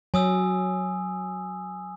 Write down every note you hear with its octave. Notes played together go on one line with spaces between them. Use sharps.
F#3 G#5 D#6 E6